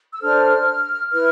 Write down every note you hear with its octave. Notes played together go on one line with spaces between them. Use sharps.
E6
D4 A4 C5 F6
E4 B4 F6